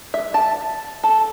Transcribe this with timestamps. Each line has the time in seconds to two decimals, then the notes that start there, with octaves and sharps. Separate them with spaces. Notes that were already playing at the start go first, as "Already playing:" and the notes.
0.14 E5
0.34 A5
1.04 A4